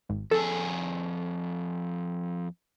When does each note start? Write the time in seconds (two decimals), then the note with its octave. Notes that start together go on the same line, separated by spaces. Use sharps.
0.09 G#1
0.31 F2 G#4 A4